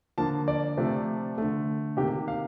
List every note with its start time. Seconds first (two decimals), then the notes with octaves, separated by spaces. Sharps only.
0.18 D3 F3 A#3 A5
0.48 D5
0.77 C3 F3 A3
1.38 D3 A3
1.97 C3 D#3 A#3 G4
2.28 F5